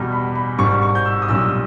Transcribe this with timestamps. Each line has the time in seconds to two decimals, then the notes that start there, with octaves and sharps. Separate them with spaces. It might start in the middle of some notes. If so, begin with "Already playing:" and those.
Already playing: E2 B2 G3
0.12 B5
0.35 B5
0.58 G#1 G#2 G3 C#6
0.82 C#6
0.95 G6
1.05 E6
1.22 D#6
1.28 B1 A#2 G3 E6